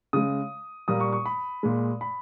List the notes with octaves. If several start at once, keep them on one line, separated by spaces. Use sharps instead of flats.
C#3 G#3 D#6
A#2 G3 A#3 D#6
C#6
C#6
B5
A#2 G#3
B5